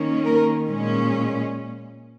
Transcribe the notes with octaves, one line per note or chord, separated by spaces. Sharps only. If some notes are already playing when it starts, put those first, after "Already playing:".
Already playing: D#3 A#3 C#4
A#4
A#2 G#3 C#4